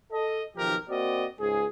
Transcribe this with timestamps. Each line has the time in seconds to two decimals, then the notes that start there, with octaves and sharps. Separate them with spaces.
0.11 A4 D#5
0.56 B1 D#3 F3 G4 A#4
0.89 A#3 C4 F#4 D5 D#5
1.39 C#2 G#2 G#4